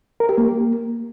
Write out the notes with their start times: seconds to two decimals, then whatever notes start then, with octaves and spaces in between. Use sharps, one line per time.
0.20 A#4
0.29 G4
0.38 A#3